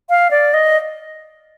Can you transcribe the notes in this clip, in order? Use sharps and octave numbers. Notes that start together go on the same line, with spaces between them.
F5
D5
D#5